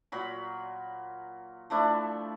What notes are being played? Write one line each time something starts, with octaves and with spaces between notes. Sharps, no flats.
A#2 F#3 B5
F3 A3 D4 E4